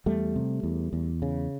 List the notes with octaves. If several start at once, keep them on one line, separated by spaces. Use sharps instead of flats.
E2 G3 A3
C3
E2
E2
C#3